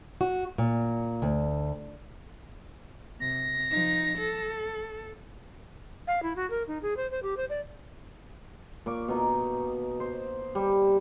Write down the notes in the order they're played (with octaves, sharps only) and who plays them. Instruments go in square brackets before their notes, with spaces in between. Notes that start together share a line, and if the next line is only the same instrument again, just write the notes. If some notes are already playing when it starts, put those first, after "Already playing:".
[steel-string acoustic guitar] F#4
A#2
D2
[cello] C3 [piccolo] A#6
[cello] F3 D#4
A4
[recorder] F5
E4
F#4
A#4
D#4
G#4
C5
C5
G4
C5
D5
[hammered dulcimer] A#2 C#6 D6
B2 D#4
C5
G3